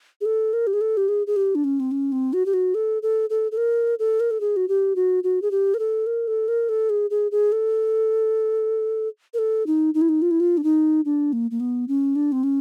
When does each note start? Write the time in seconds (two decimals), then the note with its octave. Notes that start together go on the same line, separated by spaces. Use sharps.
0.21 G#4
0.26 A4
0.53 A#4
0.67 G4
0.73 G#4
0.81 A4
0.97 G4
1.09 G#4
1.27 G#4
1.36 G4
1.55 D4
1.64 C#4
1.80 C4
1.91 C#4
2.12 C4
2.33 F#4
2.46 G4
2.54 F#4
2.75 A4
3.03 A4
3.30 A4
3.52 A4
3.57 A#4
3.99 A4
4.20 A#4
4.31 A4
4.41 G#4
4.56 F#4
4.69 G4
4.96 F#4
5.24 F#4
5.42 G#4
5.51 G4
5.74 A#4
5.79 A4
6.07 A#4
6.28 A4
6.48 A#4
6.69 A4
6.90 G#4
7.10 G#4
7.32 G#4
7.52 A4
9.34 A#4
9.39 A4
9.67 D#4
9.94 D#4
10.01 E4
10.09 D#4
10.22 F4
10.31 E4
10.40 F4
10.58 D4
10.64 D#4
11.05 D4
11.33 A#3
11.51 A#3
11.60 B3
11.88 C#4
12.16 D4
12.32 C4
12.44 C#4